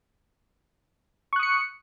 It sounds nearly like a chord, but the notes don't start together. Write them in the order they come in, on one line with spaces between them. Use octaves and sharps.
C#6 F#6 D#6 C#7